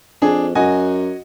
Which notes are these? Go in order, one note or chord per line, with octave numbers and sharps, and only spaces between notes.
F2 D4 G#4
F#2 F#4 D#5 G#5